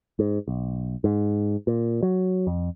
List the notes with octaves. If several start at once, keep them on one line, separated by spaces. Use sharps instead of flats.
G#2
B1
G#2
A#2
F#3
F2